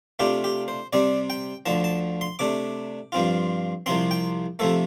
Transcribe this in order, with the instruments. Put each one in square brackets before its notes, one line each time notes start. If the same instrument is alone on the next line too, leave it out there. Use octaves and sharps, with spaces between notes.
[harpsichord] C3 A3 D4 F4 G4
G4
C5
C3 G3 C4 D5
G5
D2 D3 F3 A5
A5
C6
C3 A3 D4 D6
G2 F3 C4 F4
C2 C3 F3 C4 C6
G5
C3 F3 A3 A4